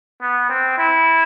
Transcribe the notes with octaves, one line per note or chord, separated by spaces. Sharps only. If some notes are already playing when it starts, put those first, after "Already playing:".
B3
C4
E4